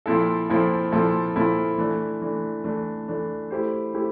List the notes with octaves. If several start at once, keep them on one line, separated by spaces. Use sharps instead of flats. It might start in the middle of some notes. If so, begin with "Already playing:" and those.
A#2 F3 C4 E4 A4
A#2 F3 C4 E4 A4
A#2 F3 C4 E4 A4
A#2 F3 C4 E4 A4
E3 A3 D4
E3 A3 D4
E3 A3 D4
E3 A3 D4
A3 E4 G4 C5
A3 E4 G4 C5